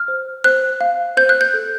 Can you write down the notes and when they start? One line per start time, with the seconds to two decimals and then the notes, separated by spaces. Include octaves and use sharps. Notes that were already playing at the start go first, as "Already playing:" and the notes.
Already playing: F6
0.08 C5
0.44 C5 F#6
0.81 F5
1.17 C5 G6
1.29 F#6
1.41 G6
1.54 A4